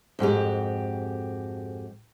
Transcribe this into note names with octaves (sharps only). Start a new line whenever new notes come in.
F2 G#2 F#4 G4